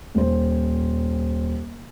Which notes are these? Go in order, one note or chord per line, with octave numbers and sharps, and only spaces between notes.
D#1 C5